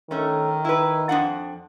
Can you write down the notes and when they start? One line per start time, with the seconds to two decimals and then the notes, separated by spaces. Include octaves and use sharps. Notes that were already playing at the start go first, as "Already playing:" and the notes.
0.11 D#3 A3 C#4
0.65 E4 B4
1.09 F2 D4 F#5